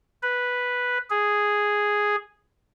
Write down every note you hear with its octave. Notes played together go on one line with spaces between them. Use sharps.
B4
G#4